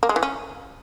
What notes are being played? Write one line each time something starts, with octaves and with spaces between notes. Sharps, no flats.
A#3
G#3
E3
C#4